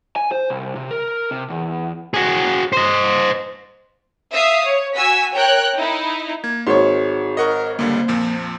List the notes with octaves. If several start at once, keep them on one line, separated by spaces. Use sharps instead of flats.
G#5
C5
C2
C3
A#4
C3
E2
F#4 G#4
C5 D#5
E5 F5 D#6
C#5
F#4 G#5 E6 B6
A#4 C#5 G5 F#6
D#4 E4
A#3 G#6
G#1 D#4 F#4 G#4 A#4 C#5 C6
A#4 D#5 F#5 C#6
C#2 D3 G3 A#3 C5
F2 A#2 F3